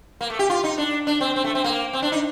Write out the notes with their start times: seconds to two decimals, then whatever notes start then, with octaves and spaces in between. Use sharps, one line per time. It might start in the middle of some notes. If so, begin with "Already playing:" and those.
0.21 A#3
0.30 A3
0.39 G4
0.50 F4
0.64 D#4
0.78 D4
1.07 D4
1.21 C4
1.36 C4
1.44 A3
1.55 C4
1.64 A#3
1.93 C4
2.02 D4
2.12 D#4